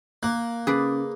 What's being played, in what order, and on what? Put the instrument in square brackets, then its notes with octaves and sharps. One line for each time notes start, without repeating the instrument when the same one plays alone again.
[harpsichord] A#3 [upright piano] F#6
[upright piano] C#3 [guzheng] G#4 B4 D5